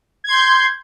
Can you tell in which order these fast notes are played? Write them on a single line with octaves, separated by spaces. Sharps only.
G#6 C6 G6